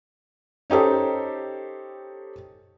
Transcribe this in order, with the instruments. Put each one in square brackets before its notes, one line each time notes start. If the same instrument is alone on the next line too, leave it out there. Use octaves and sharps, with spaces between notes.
[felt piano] C#4 D#4 G4 A4 C5